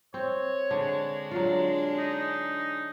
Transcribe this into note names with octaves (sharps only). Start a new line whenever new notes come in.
C4 C#5
D3 G#3 D4
F#3 F4
D#4